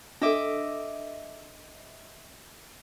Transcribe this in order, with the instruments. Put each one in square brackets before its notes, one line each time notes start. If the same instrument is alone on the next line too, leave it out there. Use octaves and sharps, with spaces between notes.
[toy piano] D4 A4 [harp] D#5 E5 D6